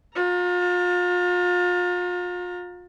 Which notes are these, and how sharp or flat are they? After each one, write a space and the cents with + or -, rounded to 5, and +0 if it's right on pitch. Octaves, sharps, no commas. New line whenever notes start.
F4 +35 A#5 +0